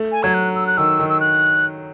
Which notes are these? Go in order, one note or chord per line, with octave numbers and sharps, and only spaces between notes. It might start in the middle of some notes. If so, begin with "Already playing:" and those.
Already playing: A3
G#5
F#3 G#6
F#6
E6
F#6
D#3 E6
D#3
E6
F#6